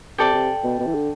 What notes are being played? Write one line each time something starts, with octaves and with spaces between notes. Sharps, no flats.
C3 A4 D5 G5 D6
C3
B2
B2
E3
D3